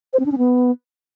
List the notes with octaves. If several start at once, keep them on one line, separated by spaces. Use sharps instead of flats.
C5
C4
D4
C#4
B3